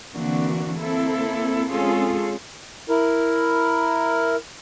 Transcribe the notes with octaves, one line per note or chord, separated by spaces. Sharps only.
D3 E3 A#3 C4 D4 F#4
A#3 C4 E4 A4
G#3 C4 C#4 F4 G#4 A4
E4 A#4